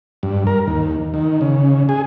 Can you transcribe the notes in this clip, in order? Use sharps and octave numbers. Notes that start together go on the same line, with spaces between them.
G2
A#4
D#2
D#3
C#3
G#4